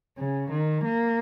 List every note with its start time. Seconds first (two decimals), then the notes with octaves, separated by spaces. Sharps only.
0.18 C#3
0.50 D#3
0.84 A#3